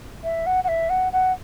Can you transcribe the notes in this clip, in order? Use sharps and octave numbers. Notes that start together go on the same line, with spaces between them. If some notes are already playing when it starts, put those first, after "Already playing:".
E5
F#5
F#5
E5
F#5
F#5